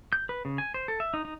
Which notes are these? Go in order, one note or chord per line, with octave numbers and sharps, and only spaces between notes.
G6
B4
C#3
G#5
C5
A4
E5
D#4
D#4